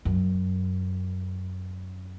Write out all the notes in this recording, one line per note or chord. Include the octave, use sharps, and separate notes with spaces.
F#2